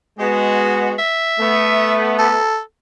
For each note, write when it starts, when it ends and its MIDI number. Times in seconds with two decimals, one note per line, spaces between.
0.19 0.95 56
0.19 0.95 59
0.19 0.95 66
0.99 1.94 76
1.40 2.36 57
1.40 2.36 59
2.19 2.60 69